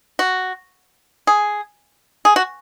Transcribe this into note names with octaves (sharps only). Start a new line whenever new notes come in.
F#4
G#4
G#4
F#4